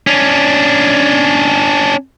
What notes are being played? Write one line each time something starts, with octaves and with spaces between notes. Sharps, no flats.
C#4 D4